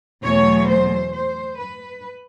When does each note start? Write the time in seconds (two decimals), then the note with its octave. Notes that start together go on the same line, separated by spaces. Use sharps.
0.23 E2 B2 F#3 A3 C#5
0.68 C5
1.13 C5
1.58 B4